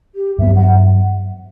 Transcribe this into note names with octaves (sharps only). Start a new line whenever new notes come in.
G4
G2 F#3 B3 E5
F#5